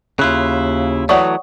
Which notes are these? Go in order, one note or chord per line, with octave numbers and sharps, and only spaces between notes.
D#2 C#3 E4 F4 F#6
E3 F#3 A3 C#5 D5 F#5 C#6 D#6